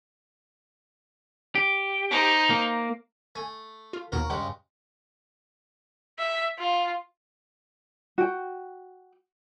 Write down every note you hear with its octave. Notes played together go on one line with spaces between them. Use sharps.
G4
D#4 C5
A#3
A3 G#5
F4
A#1 D#2 B2 F#4 A#4
G2 C#3 G#3 F#5
E5
F4
F#4 G5